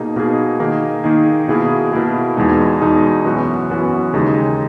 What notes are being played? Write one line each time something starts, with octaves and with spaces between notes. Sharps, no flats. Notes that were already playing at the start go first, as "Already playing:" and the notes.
Already playing: B2 A#3 D#4 G#4
B2 A#3 D#4 G#4
D#3 A#3 D#4 G#4
D#3 A#3 D#4 G#4
B2 A#3 E4 G#4
B2 A#3 E4 G#4
E2 B2 G#3 D#4
E2 B2 G#3 D#4
F#2 E3 B3 F#4
F#2 E3 B3 F#4
D#2 C#3 G#3 D#4